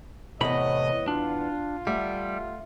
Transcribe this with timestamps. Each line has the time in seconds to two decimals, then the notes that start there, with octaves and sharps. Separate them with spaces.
0.41 E2 A2 C3 B3 C#5 D#5 B5
1.08 D4 F4
1.87 G3 A3 E5 F#5